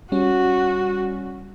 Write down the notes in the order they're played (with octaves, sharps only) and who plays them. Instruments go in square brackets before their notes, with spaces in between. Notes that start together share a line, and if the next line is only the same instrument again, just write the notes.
[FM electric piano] G3 C#4 [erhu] F#4